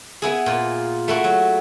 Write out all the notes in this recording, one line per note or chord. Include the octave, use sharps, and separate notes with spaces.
B3 E4 G#4
A#2 F4
A3 E4 F#4
F#3